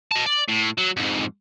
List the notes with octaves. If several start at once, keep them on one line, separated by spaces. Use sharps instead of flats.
D#5 A5
D5
A2
F#3
F2 G#2